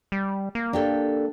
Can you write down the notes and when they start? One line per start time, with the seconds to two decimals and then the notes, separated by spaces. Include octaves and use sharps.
0.12 G3
0.55 A#3
0.73 D4 G4 A4